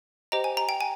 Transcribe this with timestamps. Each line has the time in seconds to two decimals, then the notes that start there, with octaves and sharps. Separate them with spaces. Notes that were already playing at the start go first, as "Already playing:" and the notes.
0.32 G4 C5 D#5 G5 A#5
0.44 G#5
0.57 A#5
0.69 G5
0.81 G#5